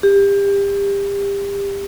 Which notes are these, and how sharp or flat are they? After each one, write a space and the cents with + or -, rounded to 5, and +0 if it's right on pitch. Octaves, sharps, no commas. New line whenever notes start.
G4 +30